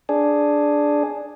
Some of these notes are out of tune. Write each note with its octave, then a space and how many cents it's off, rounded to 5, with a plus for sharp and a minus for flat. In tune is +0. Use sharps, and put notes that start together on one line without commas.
D4 +0 G#4 +0